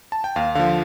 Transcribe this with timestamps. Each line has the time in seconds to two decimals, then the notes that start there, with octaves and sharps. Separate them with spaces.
0.12 A5
0.24 G5
0.36 D#2 F5
0.55 D3 F3 F5